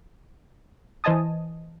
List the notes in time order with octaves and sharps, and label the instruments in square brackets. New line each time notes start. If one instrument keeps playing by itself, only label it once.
[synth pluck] E3 C5 D#5 G#5 A5 D#6